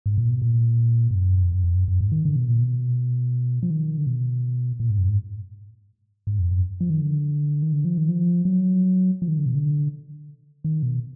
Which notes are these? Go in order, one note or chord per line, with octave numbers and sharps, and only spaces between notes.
G#2
A#2
B2
A#2
G#2
F#2
F2
F#2
F2
F#2
F#2
G#2
D#3
D3
B2
A#2
B2
F3
D#3
D3
B2
A#2
G#2
F#2
G#2
G#2
F2
F#2
F3
D#3
D3
D#3
D3
F3
D#3
F3
F#3
F3
D#3
D3
B2
D3
D#3
B2